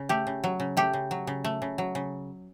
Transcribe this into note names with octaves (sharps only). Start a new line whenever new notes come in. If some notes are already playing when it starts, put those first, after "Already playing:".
Already playing: C#3
A3 G4
C#3
F#3
C#3
A3 G4
C#3
F#3
C#3
A3
C#3
F#3
C#3